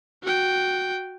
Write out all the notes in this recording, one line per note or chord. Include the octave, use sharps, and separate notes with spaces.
F#4 G5